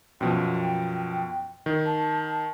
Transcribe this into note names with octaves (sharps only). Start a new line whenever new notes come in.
F#2 B2 F3 G5
D#3
A5